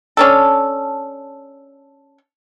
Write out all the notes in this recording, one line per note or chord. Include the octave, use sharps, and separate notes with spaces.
C#4 D4 A4